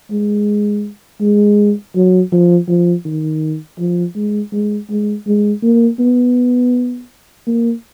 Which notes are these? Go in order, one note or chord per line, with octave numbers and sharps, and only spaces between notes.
G#3
G#3
F#3
F3
F3
D#3
F3
G#3
G#3
G#3
G#3
A#3
B3
A#3